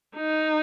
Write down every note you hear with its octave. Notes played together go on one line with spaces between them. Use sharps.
D#4